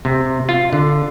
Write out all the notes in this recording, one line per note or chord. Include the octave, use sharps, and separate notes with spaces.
C3
F4
D3